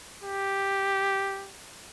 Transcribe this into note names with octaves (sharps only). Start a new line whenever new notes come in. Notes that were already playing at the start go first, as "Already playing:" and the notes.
G4